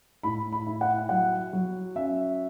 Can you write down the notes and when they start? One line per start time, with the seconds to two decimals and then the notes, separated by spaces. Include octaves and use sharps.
0.23 A2 B5
0.52 B5
0.67 E4
0.81 F#5
1.09 F#3 F#5
1.53 F#3
1.96 C#4 E5